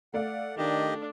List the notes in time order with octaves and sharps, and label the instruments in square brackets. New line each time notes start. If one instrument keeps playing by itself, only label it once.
[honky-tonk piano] A3 D5 F5 [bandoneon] F#5
[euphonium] D#3 [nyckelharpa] D4 [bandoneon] G4 D#5